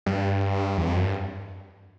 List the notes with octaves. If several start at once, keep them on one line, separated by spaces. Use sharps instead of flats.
G2
E2
F2
F#2
G2